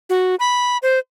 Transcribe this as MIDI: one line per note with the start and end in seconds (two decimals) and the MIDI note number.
0.10 0.35 66
0.39 0.77 83
0.82 0.99 72